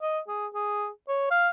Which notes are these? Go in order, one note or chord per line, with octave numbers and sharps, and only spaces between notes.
D#5
G#4
G#4
C#5
F5